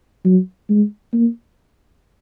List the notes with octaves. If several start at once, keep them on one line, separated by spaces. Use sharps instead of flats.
F#3
G#3
A#3